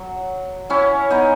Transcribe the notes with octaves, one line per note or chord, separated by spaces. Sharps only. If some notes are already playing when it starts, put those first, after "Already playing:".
Already playing: F#3
C#4 E4
B3 D#4